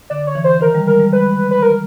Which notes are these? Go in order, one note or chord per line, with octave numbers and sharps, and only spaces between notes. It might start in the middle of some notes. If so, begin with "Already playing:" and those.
D3 D5
C#5
E3
C5
D#3 A#4
G3
G#3 A#4
G3
G#3 B4
B4
A#4